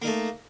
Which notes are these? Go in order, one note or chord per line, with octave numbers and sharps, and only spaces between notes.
A3 A#3 D#4